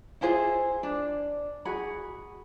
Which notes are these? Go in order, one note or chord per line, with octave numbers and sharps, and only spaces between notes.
E4 F4 G#4 C5
D4
F#4 G#4 B5